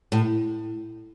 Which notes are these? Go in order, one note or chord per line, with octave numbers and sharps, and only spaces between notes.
A2